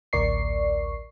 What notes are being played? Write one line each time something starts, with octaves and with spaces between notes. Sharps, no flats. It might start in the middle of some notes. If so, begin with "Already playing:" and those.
A1 D2 A#4 D5 C#6 C7